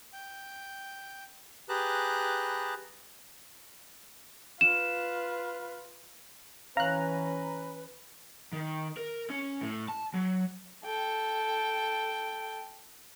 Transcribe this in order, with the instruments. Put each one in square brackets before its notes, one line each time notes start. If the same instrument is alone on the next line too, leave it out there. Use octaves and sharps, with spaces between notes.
[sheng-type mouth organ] G5
G4 G#4 B4 A5 A#5 F#6
[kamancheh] F4 B4 [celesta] E7
[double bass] E3 C#4 [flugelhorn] B4 [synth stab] F5 F#6 [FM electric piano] A#5
[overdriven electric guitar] D#3
A#4
C#4
A2
A5
F#3
[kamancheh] A4 G5